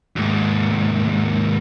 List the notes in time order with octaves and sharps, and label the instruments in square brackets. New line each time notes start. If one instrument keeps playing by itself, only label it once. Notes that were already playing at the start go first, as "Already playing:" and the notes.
[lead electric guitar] D#2 G#2